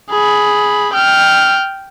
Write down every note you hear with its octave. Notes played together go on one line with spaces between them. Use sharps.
G#4 B5
G5 F6